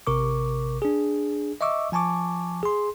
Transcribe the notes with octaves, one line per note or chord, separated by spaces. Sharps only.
A1 C3 A#4 C#6 D6
D4 G#4
D#5 E5 C#6 D6 E6
F3 G#5 A5 C#6 D6
G#4 C6